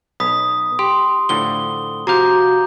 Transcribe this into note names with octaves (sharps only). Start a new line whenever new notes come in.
B1 B5 D#6 B6
G4 C6
A2 D3 F3 G7
C3 F3 F#4 F5 A#5 D6 G6